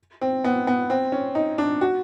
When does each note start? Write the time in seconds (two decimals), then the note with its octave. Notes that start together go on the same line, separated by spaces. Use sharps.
0.21 C4
0.44 B3
0.67 B3
0.90 C4
1.12 C#4
1.35 D#4
1.58 D4
1.81 F#4